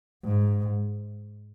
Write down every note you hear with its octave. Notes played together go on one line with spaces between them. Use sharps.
G#2